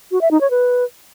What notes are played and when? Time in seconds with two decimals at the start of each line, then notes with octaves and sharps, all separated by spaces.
0.11 F#4
0.21 E5
0.31 D#4
0.41 C#5
0.50 B4